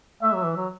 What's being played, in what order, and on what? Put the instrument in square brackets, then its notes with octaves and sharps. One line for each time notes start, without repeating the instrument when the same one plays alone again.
[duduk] A3 [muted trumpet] E5
[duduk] F#3
E3
F#3